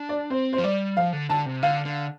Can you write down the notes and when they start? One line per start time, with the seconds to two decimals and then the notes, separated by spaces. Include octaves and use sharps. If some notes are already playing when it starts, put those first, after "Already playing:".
Already playing: D4
0.09 D5
0.30 C4 C5
0.53 C5
0.58 F3
0.64 G3 D5
0.97 F3 F5
1.13 D3
1.29 D3 A5
1.46 C3
1.62 D3 F5
1.85 D3